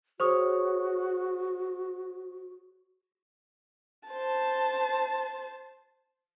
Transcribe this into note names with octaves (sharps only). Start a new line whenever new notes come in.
F#4 G#4 C5 C#5 C#6 D#6
C5 A5